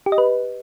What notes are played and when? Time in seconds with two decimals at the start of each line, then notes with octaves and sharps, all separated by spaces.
0.06 G4
0.12 D#5
0.18 B4